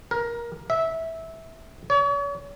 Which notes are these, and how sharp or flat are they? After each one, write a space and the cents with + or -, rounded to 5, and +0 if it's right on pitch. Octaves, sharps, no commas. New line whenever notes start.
A#4 +15
E5 -15
C#5 +40